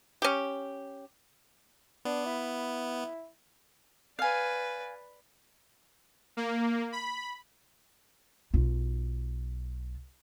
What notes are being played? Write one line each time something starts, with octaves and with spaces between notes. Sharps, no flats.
C#4 G4
B3 D4
E4
B4 D5 F5 G#5
A#3
B5
B1 F4